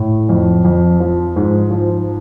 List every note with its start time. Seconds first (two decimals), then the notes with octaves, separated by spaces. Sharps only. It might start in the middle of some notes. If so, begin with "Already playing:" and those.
Already playing: A2
0.29 F2
0.65 F2
1.00 F3
1.36 G#2
1.71 F3